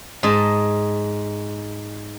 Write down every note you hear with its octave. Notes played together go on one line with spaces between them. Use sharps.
G#2 D#5 A5